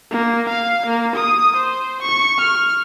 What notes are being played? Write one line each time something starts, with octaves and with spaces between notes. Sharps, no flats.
A#3
F5
A#3
D#6
C5
C#6
F6